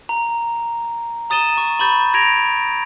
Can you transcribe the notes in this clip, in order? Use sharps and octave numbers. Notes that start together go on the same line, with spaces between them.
A#5
A#5 D#6 A6 D#7 E7 G7
C#6
B5 C#6 G6 A6
G#6 A#6 D7 F7